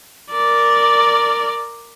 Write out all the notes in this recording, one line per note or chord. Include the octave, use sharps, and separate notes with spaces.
A#4 D5